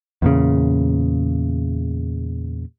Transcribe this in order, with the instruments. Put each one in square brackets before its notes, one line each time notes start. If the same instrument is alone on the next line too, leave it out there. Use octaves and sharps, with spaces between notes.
[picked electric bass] E2 A#2 C#3